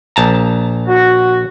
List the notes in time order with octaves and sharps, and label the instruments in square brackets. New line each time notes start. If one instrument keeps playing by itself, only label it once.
[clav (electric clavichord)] A#1 A5 A#5
[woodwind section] F#4